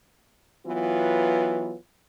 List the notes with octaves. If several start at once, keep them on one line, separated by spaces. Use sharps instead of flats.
E3 F#3 B3 F4